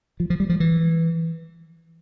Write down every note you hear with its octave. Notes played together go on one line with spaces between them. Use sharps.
F3
F3
G3
F3
E3